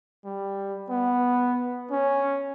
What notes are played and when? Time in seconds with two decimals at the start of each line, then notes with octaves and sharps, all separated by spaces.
0.25 G3
0.90 B3
1.90 C#4